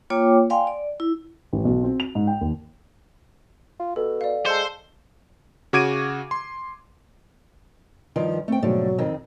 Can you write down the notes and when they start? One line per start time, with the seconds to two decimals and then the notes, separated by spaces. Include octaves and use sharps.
0.10 A#3 F4 C#5 G5 D6
0.50 D5 F5 G5 G#5 C6
0.67 D5
1.00 E4
1.53 A1
1.65 B1
1.83 C4
2.00 F7
2.15 G#2
2.27 G5
2.41 D#2
3.80 F4
3.96 B2 A4
4.21 D5 F5
4.46 G#3 C5 A5 E6 C#7
5.73 C#3 F#4 D6 G#6 D7 D#7
6.31 C6
8.16 G2 D#3 F3
8.48 A3 C4 G5
8.62 G#2 B2 D3 F3 F#3 A3
8.98 F2 D#3 C4